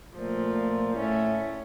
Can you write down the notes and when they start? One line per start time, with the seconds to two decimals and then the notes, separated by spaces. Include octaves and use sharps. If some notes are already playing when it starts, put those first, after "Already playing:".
0.17 A#2 F3 A3
0.96 A2 A3 C#4